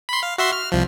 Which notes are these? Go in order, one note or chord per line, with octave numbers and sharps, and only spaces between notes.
B5 C6
F5
F#4 E5 C6
F6
C2 F3